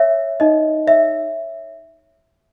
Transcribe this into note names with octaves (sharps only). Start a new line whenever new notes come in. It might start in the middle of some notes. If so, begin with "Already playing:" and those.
Already playing: C#5 E5
D#4 D#5
C#5 E5